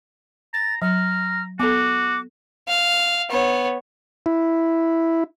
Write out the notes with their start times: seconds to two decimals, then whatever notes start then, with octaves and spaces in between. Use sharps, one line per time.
0.54 A#5 A6
0.82 F#3 A#5 F6
1.59 B3 F#4 A4 D6
2.68 F5
3.30 B3 C#5
4.26 E4